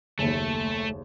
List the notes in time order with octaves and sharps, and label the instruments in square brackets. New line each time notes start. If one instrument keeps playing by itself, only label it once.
[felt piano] F#1 D#2 [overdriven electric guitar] A3